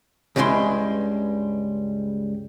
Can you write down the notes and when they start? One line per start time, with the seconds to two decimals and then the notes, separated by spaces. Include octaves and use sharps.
0.36 C#2 G2 G3 G#3 E4 C6